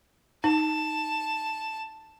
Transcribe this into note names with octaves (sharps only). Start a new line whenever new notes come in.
D#4 A5